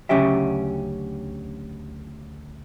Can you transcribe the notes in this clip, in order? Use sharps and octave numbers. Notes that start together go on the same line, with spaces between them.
D2 C#3 F#3 C#4 G4 E5